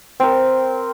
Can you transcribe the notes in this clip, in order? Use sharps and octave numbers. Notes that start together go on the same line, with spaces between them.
C4 A#4